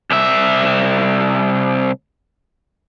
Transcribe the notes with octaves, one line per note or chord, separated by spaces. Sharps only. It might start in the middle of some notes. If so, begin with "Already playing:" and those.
C2 E5